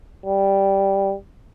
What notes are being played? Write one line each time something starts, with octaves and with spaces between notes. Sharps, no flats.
G3